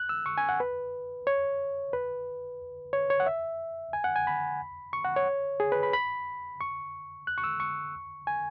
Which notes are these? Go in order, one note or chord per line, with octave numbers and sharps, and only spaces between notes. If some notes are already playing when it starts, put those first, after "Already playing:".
Already playing: F#6
E6
C#6
G#5
F#5
B4
C#5
B4
C#5
C#5
F#5
E5
G#5
F#5
G#5
B5
C#6
F#5
C#5
G#4
B4
B5
B5
C#6
F#6
C#6
E6
C#6
G#5